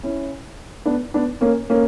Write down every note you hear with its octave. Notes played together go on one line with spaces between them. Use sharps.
C#4 E4
B3 D4
B3 D4
A#3 C#4
A#3 C#4